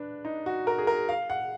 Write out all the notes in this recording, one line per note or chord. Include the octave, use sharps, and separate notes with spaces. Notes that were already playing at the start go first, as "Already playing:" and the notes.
Already playing: D4 B4
D#4
F#4
A#4
G#4
A#4
F5
F#5